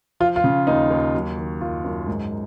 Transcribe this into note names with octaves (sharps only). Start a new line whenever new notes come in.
F3 F4
F4
C#3
D#2 D#4
D#2
F#3
D#3
F#2 F4
F#2
G#2